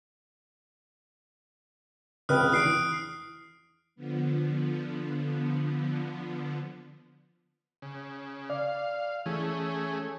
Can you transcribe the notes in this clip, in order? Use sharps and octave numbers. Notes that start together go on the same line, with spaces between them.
C#2 C4 B4 D#6 F6 F#6
E2 D#6 C7 D7
E3
D3 F3 B3
C#3
D5 F5
E3 A3 C#4 G#4